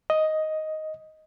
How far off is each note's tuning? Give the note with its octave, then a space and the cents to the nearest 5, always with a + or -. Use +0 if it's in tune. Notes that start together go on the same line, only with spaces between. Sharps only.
D#5 +5